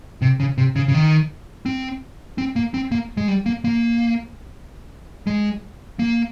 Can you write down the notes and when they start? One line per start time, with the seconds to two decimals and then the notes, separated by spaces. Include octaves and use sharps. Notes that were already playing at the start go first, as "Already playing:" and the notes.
0.22 C3
0.40 C#3
0.58 C3
0.76 C#3
0.88 C#3
0.94 D#3
1.66 C4
2.38 C4
2.56 A#3
2.74 C4
2.92 A#3
3.17 G#3
3.28 G3
3.46 A#3
3.65 A#3
5.27 G#3
5.99 A#3